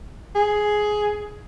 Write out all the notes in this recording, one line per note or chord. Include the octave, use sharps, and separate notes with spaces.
G#4